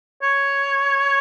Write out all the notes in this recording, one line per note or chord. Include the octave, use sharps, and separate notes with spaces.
C#5